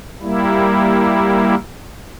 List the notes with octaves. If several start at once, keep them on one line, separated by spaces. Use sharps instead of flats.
G3 A#3 E4